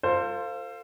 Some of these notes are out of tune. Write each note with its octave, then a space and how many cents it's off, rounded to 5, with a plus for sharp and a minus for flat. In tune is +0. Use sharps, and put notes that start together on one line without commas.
F4 +0 A4 +40 C5 +0